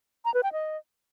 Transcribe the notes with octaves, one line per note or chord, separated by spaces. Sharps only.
A#5
B4
G5
D#5